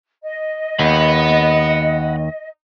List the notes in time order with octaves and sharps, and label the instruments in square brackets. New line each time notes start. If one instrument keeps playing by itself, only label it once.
[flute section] D#5
[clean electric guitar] D#2 [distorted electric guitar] F#5 B5